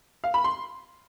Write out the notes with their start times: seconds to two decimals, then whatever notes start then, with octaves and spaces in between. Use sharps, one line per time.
0.24 F5
0.34 B5
0.44 C6